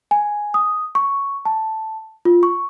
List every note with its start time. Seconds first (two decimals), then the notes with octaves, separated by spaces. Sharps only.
0.11 G#5
0.54 D#6
0.95 C#6
1.45 A5
2.25 F4
2.43 C#6